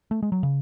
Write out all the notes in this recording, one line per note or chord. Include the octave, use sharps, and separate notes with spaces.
A3
G#3
F#3
C#3